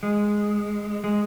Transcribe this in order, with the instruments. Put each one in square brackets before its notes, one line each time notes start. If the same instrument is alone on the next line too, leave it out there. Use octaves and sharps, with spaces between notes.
[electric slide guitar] G#3
G#3